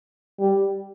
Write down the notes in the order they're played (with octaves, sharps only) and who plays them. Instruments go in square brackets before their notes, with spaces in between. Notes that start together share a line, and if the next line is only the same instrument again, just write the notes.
[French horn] G3